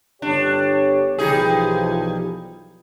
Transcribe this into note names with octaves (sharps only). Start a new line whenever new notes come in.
G1 D4 G4 C#5
B1 E3 F3 G3 D#4 G#4